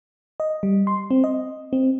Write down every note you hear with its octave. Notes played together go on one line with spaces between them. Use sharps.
D#5
G3
C6
C4
D#5
C4